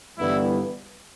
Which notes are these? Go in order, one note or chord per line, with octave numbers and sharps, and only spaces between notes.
G1 G2 E3 G3 B3 E4